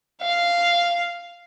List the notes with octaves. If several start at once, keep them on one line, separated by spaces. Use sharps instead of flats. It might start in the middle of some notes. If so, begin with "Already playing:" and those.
F5